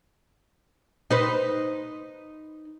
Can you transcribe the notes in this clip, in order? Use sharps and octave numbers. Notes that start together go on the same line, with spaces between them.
D#4 B4 C5